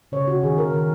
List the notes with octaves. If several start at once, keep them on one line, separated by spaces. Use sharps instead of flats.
C#3 C#5
C#3 F#4
D#3 G#4
D#3 A#4
D#3 A#4